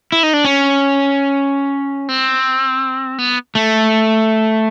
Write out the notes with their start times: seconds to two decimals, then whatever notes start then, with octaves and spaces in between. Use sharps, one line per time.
0.12 E4
0.23 D#4
0.33 D4
0.45 C#4
2.09 C4
3.18 B3
3.55 A3